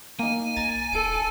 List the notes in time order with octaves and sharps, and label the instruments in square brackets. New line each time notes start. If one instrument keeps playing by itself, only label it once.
[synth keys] A#3 D#4 [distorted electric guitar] G#5
[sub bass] B1 [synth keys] A#5 G#6 A6
[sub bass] D#1 [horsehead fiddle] A4 [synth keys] D7